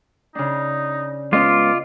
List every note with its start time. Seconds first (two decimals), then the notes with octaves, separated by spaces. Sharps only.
0.35 C#3 D4 D#4
1.33 G#3 B3 C#4 F4 D#5 D6